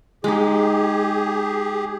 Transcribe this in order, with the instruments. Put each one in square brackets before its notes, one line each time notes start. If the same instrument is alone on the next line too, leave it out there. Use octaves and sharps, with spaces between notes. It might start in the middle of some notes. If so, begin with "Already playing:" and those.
[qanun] G#3 D#4 [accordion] G4 G#4